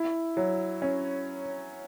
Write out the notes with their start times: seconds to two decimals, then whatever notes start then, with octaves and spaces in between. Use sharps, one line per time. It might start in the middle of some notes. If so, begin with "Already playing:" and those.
Already playing: E4
0.37 F#3
0.82 C#4